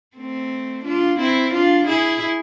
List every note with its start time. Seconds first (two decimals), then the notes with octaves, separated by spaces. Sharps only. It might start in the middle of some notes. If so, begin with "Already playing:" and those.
0.17 A3 C4
0.85 D4 F4
1.19 C4 E4
1.53 D4 F4
1.87 E4 G#4